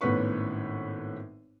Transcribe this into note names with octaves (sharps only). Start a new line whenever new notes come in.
G#1 A2 B3 C#4 B4 C#6